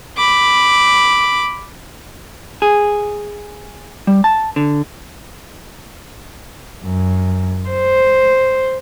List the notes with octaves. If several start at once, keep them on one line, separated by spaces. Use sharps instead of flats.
B5 D6
G#4
G3
A5
D3
F#2
C5